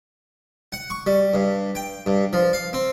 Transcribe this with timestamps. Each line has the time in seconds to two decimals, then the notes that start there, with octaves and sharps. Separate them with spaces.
0.72 F#5
0.90 C#6
1.07 G3
1.34 G2
1.75 G5
2.06 G2
2.33 F3
2.53 F5
2.73 C4